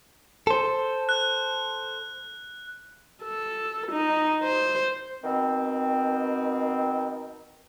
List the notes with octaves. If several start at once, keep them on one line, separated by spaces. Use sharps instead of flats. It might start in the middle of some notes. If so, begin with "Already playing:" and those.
A4 C5
F#6
A4
D#4
C5
B2 D#3 C4